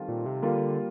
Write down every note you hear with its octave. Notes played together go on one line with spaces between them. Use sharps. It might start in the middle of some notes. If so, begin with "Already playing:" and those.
Already playing: D#3 G3 C4 F4 A4
A#2
C3
D3 G3 A#3 F4